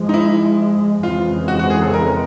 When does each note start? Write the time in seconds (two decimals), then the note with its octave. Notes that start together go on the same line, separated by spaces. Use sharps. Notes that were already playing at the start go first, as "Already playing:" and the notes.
Already playing: G#2 F3 G#3
0.09 D#4
0.14 E4
1.03 F2 C#3 E3 G#3 C4 F4
1.48 F#4
1.59 F#4
1.70 G#4
1.82 A4
1.94 A#4